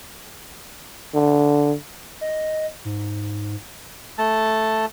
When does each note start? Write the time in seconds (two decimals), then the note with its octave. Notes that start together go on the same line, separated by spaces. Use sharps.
1.14 D3
2.21 D#5
2.85 G#2
4.18 A3 A5